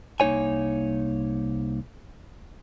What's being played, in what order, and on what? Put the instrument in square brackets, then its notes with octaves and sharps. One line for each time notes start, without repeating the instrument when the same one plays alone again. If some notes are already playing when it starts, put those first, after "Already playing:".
[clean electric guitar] C2 A#3 D4 D#4 C#5 G#5